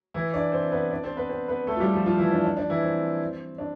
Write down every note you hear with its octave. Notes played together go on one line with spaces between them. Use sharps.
E3 E4
D4 D5
C4 C5
B3 B4
D4 D5
C4 C5
B3 B4
C4 C5
B3 B4
A3 A4
F4
G3 G4
F3 F4
F3 F4
E3 E4
D4
D4
D4
E3 E4
C4
D4